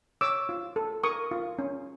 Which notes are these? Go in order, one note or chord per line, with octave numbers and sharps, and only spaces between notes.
C#5 D6 E6
F4
A4
A#4 C#6 D#6
F4
C#4